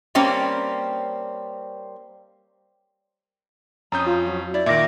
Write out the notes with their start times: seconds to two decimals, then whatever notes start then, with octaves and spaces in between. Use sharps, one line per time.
0.15 G3 A#3 C4 C#4 D5
3.92 F2 C#4 A#5 D#6 G6
4.07 F4
4.26 F#3 F#4
4.54 E4 D5
4.66 A#2 D#3 E5 D6 A#6